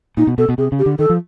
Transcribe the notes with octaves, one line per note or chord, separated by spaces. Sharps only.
A#2 D#4
B2
B2 A4
B2
C3 G#4
C#3
G4
D3
D#3 A4
F3